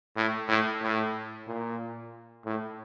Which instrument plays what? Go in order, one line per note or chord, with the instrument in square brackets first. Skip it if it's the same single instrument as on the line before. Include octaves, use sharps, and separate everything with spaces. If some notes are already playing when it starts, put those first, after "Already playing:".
[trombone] A2
A2
A2
A#2
A2